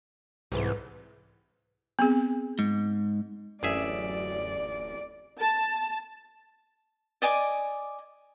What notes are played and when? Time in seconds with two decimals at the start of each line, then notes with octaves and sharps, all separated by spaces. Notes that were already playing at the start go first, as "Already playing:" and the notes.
0.52 C2 G#2 E3
1.99 B3 C4 G#4
2.59 G#2
3.63 D1 A1 F#2 G#4 D5 E5
5.40 A5
7.22 D5 D#5 G#5 D6